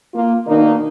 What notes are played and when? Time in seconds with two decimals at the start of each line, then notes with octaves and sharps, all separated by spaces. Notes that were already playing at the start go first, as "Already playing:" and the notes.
0.15 A#3 F4
0.47 B2 D#3 A#3 D4 D#4